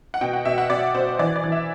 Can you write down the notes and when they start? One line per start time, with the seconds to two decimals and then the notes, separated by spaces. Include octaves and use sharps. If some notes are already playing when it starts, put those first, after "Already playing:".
0.14 F#5
0.21 B2 G5
0.33 F#5
0.45 B2 E5
0.58 F#5
0.70 B2 D5
0.94 B2 C5
1.19 E3 D5
1.36 D5
1.44 E3
1.52 E5